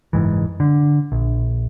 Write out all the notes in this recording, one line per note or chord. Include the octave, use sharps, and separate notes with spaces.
F#1 C2 G#2 E3
D3
A#1